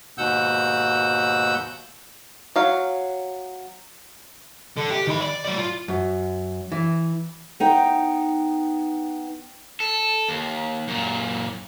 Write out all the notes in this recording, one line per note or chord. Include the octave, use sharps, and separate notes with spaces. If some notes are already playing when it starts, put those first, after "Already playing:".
D#2 G#2 B2 F#5 E6 G6
F#3 F5
D3
G4
D#3 B5
D5
F#3 D5
F4
F#2
E3
B3 D#4 G5
A4
D#2
F#2 A#2